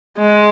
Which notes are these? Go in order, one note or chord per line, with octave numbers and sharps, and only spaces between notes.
G#3